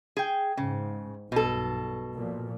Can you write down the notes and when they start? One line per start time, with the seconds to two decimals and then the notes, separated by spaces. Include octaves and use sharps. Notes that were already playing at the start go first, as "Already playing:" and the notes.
0.17 G#4 G5
0.57 G#2 C#3
1.32 B1 G2 B2 A4
2.14 A#2 F3